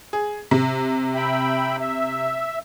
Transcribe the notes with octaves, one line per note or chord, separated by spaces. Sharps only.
G#4
C3
E5 G5 B5
E5